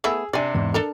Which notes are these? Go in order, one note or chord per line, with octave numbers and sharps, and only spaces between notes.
A3 B3 E4 G#4 E6
C3 D4 D5 G#5
E2 G#2
D4 A4 A#4